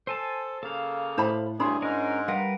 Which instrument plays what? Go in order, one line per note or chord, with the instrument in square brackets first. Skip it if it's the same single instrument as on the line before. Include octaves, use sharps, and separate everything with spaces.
[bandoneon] A4 [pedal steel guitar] C5 G#5 A5
[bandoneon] C#3 A#3 [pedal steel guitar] A4 F5
[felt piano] A2 [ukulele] C5 A5 B5
[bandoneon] D2 G2 G#4 [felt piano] D4 C6 [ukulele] E4 C#5 B5
[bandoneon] G#2 G#3 [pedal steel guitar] C#4 A#4
[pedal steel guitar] G3 A#4 B4 [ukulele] F5 F#5